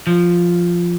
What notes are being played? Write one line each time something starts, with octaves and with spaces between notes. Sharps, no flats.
F3